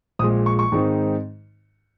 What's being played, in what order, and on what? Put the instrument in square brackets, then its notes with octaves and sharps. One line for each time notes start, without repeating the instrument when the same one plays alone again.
[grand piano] A#1 A#2 G#3 D#6
C#6
C#6
G#2 D#3 G#3 C4 D#4